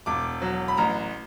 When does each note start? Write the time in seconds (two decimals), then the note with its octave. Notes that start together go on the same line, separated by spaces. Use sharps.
0.06 E1 D6
0.42 F#3
0.68 B5
0.77 A1 A#5